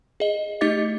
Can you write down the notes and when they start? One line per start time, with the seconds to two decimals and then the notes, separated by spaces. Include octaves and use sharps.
0.20 G#4 D#5
0.61 A3 D#4 G4 D#5 D6 A6